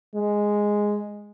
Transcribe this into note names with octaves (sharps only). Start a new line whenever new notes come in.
G#3